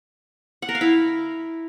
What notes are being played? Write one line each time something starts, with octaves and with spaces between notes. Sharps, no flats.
F#5
A#4
F5
E4